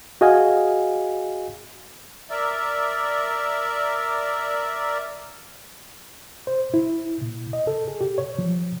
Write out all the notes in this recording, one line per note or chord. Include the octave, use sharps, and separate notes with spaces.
F#4 G#4 D#5 F5 G#5
A#4 D5 E5
C5
E4
A#2
D#5
A4
G#4
G4
C#5
F3